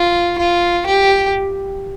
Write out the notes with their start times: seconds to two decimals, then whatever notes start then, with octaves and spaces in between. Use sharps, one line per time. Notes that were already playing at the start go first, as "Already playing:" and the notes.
Already playing: F4
0.38 F4
0.86 G4